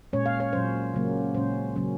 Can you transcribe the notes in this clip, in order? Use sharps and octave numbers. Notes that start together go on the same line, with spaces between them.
A#2 G#3 C#4 C#5
F5
C#5
A#2 F#3 C#4 C5
C#3 F#3 A#3 C#4
A#2 G#3 C#4 C5
C#3 F#3 A#3 C#4